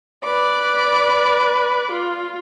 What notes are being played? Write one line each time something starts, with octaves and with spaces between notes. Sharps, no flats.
B4 D5 D6
F4